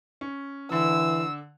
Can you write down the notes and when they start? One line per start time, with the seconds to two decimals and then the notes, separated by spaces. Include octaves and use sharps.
0.21 C#4
0.72 D3 E3 E6